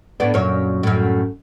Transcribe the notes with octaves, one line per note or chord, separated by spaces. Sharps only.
A2 B3 D4
F#2 A#2 C#5
F#2 A2